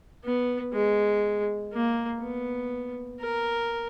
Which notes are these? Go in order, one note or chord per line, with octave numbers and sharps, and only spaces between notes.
B3
G#3
A#3
B3
A#4